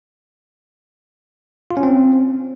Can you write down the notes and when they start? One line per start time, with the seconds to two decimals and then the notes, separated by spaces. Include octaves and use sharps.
1.71 F4
1.77 C#4
1.83 C4